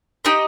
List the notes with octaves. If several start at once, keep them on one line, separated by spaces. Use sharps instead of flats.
D#4 G4 D#5